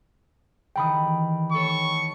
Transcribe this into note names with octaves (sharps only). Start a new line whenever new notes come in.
D#3 E3 G3 G5 B5 D#6
A3 A4 C#5 C#6